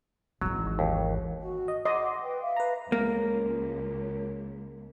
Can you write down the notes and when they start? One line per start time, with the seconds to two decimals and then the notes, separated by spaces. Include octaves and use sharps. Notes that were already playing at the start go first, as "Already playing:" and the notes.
0.41 G#1 E3 F#3
0.79 D#2
1.39 F#4
1.68 D#5
1.85 D#5 F#5 C6 D6
2.23 B4 G5
2.41 E5 F5
2.56 B4 A#5
2.92 C#2 A#3